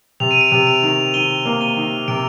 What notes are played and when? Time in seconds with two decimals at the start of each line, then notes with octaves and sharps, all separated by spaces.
0.20 C3 F7
0.31 D#7
0.41 D7 F7
0.52 C3
0.67 D7 F7
0.83 D#3
1.14 D#3 D#7 G7
1.45 A#3
1.61 D#7 G7
1.77 D#3
2.08 C3 D7 F7